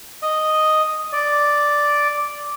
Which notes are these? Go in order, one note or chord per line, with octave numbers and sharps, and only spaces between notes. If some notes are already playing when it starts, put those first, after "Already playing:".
D#5
D5